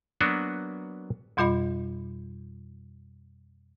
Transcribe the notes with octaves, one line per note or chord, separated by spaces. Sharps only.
F#3 A#3 B3 D4 F#4 B4
F2 B2 G3 F4 D#5 B5